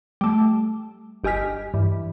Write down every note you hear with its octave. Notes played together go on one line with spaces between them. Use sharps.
G3 A3
G1 G4 D#5 G#5 F6 B6
G2 E3